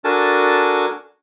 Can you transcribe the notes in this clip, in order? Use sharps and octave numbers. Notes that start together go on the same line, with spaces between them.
D4 F#4 A4 A#4 G#5 A5